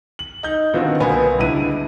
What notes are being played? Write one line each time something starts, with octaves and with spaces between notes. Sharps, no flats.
F#7
D#4 G6
D3 D#3 B3 C4 F4 F#4
B1 A#3 B3 B4 G#5 B5
C#2 D3 E4 D#7